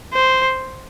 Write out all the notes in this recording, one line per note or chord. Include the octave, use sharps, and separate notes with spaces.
C5